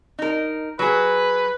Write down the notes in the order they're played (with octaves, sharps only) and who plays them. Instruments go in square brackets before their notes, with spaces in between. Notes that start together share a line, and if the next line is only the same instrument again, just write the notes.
[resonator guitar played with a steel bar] D#4 A#4
[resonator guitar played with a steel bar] F#3 G#4 [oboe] B4